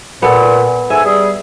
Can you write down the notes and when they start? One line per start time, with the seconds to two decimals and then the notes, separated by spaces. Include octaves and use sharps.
0.22 A#2 B3 A4
0.90 G#2 A4 E5 G#5
1.05 G3 G#4